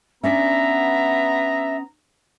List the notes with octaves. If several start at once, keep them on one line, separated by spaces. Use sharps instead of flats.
B3 C#4 D4 D5 E5 A#5